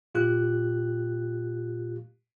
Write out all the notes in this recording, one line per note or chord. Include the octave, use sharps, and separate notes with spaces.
A#2 F4 G4 F#6